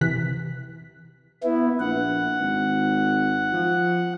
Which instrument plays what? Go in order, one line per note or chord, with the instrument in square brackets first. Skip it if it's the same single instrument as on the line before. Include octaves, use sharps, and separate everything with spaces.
[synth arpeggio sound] C3 E3 F#6 B6
[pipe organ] B3 E4
[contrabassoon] A#1 [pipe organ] F#5
[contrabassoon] G#1
F3